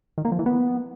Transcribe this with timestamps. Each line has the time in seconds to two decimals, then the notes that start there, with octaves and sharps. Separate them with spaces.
0.18 D#3
0.25 A#3
0.32 F3
0.39 E3
0.46 B3